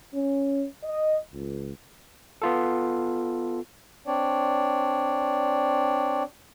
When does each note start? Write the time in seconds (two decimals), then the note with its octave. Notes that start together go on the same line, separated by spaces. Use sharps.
0.14 C#4
0.84 D#5
1.32 C#2
2.42 B3 F4 A4
4.07 C4 D4 C#5 D5